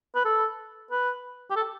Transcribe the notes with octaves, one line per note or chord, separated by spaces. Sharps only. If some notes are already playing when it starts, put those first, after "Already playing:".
B4
A4
B4
G4
A4